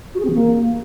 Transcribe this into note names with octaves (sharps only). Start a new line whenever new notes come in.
F#4
G#4
C4
E3
A#3